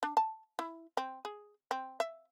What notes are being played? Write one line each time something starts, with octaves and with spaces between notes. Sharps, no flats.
D4
A5
E4
C4
G#4
C4
E5